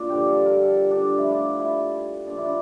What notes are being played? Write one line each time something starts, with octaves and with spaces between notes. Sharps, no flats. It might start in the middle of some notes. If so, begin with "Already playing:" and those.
Already playing: A#2 D4
G2 D3 F3 G4
A4
A#4
A4
D4
A2 F3 E4
D4
E4
A#2 F3 D4
E4
D4